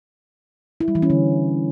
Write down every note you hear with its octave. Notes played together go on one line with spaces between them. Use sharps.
E4
G3
E3
C#4
D3